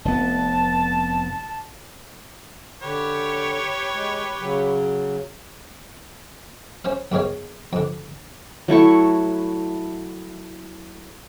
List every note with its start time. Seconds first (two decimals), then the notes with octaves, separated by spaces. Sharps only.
0.05 F1 B3 A5
2.82 D3 G4 B4 C#5
3.93 G#3
4.40 C#3 F#3
6.85 C#4 C5 F5
7.12 B1 G#2 D#3 C#5 F5
7.73 F2 D3
8.68 F#3 A3 E4 C#6